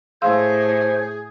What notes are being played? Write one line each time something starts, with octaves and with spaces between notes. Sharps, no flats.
A2 G#4 C5 F5 C6 E6